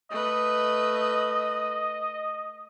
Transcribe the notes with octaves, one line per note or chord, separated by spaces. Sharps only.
A3 B4 D#5